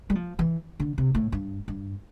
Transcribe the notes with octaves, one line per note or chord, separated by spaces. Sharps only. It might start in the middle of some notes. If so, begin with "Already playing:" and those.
G3
F3
E3
D3
C3
A2
G2
G2